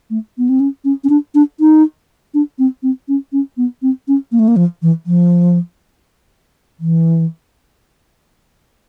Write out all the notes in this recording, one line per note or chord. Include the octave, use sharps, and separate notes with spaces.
A3
B3
C4
C#4
C#4
C#4
D4
D4
D#4
D4
C4
C4
C#4
C#4
B3
C4
C#4
A#3
A3
A#3
F3
E3
F3
E3